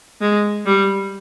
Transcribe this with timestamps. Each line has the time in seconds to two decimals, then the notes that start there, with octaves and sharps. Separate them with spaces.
0.21 G#3
0.66 G3